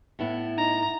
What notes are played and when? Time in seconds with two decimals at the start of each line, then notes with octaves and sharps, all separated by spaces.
0.19 A2 B3 E4
0.58 D#4 A#5